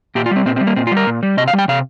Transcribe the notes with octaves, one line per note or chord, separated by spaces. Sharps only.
A#2 G4
F4
G3 C4
A#2 C4
C4
G3
A#3
A#2 C4
F4
G3
A#4
A#2
G3
C3 D#5
F5
G3
G5
C3 F5